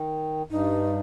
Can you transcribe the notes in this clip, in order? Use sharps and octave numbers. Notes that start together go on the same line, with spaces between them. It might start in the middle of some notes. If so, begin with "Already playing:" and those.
Already playing: D#3
G2 D#4